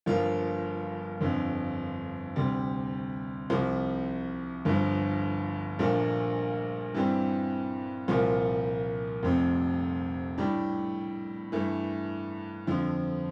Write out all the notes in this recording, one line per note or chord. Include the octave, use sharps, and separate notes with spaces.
G1 G2 F3 A#3 F4
G1 F2 D3
D2 C3 G3
C2 C3 F3
G1 G2 D3 F3
A#1 A#2 F3 A3 D4
G2 E3 G3 C4
C2 A#2 F3
F1 F2 C3
A2 G3 D4
G2 E3 A3
F2 D3 F3